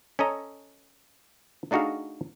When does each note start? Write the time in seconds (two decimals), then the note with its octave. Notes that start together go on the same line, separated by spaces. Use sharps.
0.19 C#4 A4 D#5 A#5
1.71 A3 D4 D#4 F#4 G#4 F5